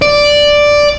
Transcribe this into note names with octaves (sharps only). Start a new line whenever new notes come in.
D5